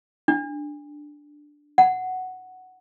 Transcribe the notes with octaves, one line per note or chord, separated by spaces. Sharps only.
D4
F#5